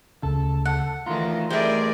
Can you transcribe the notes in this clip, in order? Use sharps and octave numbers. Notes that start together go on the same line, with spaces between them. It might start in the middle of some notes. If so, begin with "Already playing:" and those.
D2 C#3 A4
F#5
D#3 E3 A3 D#4 F4 A#5
G3 A3 E4 G#4 A#4 C5 D5